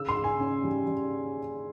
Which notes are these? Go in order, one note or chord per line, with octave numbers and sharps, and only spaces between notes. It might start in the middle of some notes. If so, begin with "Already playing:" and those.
Already playing: C#3 E6
C6
C#3
G#5
C#4
G3
G3